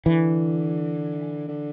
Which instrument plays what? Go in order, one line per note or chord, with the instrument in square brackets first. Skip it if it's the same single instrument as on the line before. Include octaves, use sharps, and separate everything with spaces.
[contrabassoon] D3 [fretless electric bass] E3
[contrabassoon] D3